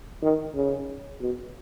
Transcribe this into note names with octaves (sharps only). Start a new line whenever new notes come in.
D#3
C#3
B2